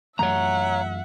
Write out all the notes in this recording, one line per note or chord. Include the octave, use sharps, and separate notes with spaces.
F#2 E3 A3 C#5 E5 F#5 A#5